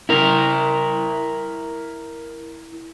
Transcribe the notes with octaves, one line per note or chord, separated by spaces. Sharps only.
E4 A#4